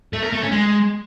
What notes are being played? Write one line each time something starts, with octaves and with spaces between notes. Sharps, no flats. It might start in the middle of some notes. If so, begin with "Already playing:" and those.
A3
A#4
A3
C#4
G#3